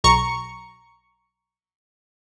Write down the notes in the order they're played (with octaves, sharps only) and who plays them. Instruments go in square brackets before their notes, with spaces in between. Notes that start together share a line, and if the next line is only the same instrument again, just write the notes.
[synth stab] B1 A#5 C#6 C#7